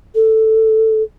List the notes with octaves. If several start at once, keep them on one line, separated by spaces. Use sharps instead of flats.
A4